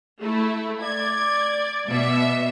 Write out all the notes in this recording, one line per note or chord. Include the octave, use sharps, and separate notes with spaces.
A3 E4
D5 G#6
B2 E5